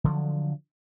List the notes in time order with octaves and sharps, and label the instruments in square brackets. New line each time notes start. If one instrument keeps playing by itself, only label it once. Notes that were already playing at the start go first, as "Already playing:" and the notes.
[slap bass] D3 F3 F#3